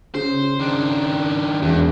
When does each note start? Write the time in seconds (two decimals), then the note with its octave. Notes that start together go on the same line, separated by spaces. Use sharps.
0.15 C#3 C5
0.59 D#3 D4
1.62 E1 E2